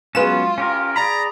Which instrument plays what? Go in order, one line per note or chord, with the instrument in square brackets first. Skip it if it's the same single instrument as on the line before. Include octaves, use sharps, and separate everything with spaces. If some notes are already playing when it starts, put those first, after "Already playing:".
[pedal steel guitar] F#3 B3 C#4 [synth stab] G#3 B4 E7 [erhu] F4
[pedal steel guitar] C#4 G4 A#4
[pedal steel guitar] G#4 D5 B5 [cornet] A#5